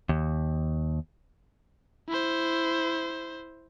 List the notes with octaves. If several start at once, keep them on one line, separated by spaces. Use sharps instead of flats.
D#2
E4 C5